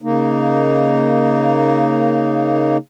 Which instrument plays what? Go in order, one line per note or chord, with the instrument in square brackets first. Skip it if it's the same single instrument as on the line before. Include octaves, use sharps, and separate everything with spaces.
[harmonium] C#3 A#3 D#4